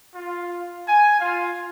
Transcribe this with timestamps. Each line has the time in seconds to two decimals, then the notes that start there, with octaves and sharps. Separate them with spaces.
0.15 F4
0.87 G#5
1.19 F4